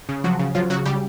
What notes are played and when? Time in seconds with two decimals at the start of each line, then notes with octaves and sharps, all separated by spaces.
0.09 C#3
0.24 F3 F#3 F#4
0.39 C#3
0.55 F3 F#3 F4
0.70 C#3 F#3 F#4
0.85 C#3 G3 G4